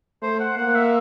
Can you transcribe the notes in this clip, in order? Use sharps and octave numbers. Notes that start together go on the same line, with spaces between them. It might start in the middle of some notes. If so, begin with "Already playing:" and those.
A3 C5
F#5
A#3 F#5
E5